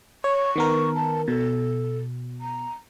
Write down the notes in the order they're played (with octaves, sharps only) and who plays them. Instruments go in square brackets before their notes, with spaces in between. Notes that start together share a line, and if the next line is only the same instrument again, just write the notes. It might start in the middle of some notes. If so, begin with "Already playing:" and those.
[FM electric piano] C#5 [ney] C#6
[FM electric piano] D#3 B3 A#4
[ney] A5
[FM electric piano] B2 [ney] A4
[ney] A#5